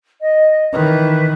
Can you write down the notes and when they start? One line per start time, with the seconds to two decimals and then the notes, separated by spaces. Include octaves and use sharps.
0.21 D#5
0.73 D#3 E3 B4